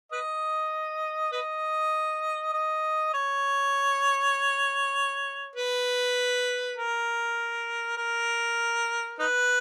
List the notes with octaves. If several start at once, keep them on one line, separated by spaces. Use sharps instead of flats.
B4 D#5
B4 D#5
D#5
C#5
B4
A#4
A#4
D#4 B4